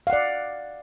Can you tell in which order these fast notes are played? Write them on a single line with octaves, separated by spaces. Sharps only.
F5 F#5 D5